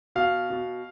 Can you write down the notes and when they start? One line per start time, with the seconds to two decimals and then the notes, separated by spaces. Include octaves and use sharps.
0.15 B2 F5
0.50 B2